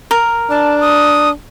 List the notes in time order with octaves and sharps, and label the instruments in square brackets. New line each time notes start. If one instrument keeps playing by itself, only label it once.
[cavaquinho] A#4
[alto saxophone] D4 [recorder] A5
[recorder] D#6